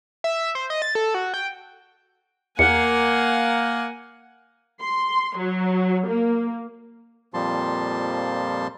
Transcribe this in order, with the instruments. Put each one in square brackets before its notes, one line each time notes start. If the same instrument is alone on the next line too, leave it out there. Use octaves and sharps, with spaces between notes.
[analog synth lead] E5
C5
D#5
A6
A4
F#4
G5
[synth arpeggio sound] E2 [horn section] A#3 [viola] F#5 G#5 [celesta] C#7
[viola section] C6
F#3
A#3
[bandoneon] F2 A#2 F3 G3 A5 C6